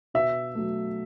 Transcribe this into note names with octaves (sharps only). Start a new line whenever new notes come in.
B2 E5
F#3 A3